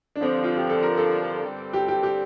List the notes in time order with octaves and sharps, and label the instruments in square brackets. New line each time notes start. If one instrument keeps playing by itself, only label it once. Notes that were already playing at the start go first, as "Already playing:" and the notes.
[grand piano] D4
[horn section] G2 D3 F3 [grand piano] C4
[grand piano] F4
G4
A4
A#4
A4
[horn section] G2 D3 G3 C4
[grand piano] G4
G4
G4